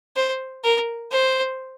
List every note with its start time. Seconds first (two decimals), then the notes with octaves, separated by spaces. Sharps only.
0.16 C5
0.64 A#4
1.12 C5